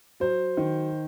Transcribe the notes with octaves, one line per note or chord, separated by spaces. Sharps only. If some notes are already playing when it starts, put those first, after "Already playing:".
F#3 C5
D#3